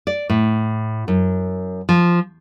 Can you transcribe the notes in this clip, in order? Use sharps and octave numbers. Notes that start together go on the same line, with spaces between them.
D5
A2
F#2
F3